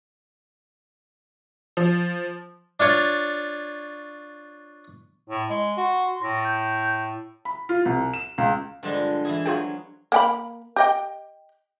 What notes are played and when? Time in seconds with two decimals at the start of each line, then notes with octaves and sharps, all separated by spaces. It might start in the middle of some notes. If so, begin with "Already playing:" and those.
1.77 F3
2.80 D4 F4 C#5
5.30 A2
5.50 G#3
5.77 F#4 C6
6.22 A2 A#6
6.44 G6
7.45 B5
7.69 F4
7.85 C2
8.14 E7
8.38 C#2
8.83 G2 D3 F3 G3 G#3
9.25 E3 E4 G#4
9.46 F#3 F4 G#4 G5 G#5
10.12 A#3 G5 B5
10.76 G4 D#5 G5